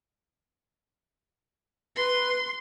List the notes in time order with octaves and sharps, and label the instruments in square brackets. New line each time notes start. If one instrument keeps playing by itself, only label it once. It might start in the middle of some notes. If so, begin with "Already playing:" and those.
[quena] B4 [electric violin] C6